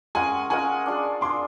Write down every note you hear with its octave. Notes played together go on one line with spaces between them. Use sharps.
G#3 C#4 F4 A#4 F#5 G#5
G#3 C#4 F4 A#4 F#5 G#5
D4 F4 G#4
D4 F4 G#4 C6 D6